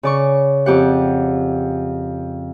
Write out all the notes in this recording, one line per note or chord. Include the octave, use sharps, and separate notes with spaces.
C#3 D5 C#6
F2 G4 F#5